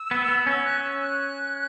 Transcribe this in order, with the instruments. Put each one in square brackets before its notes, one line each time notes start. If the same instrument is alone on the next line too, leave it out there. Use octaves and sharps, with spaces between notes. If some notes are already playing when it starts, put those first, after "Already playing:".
Already playing: [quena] E6
[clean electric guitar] B3
B3
[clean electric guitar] C#4 [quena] E6
[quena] F#6
E6
F#6